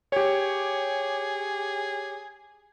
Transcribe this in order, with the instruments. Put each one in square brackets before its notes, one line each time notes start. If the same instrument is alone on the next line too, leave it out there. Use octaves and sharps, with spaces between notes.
[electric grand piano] G4 C#5 [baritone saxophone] G#4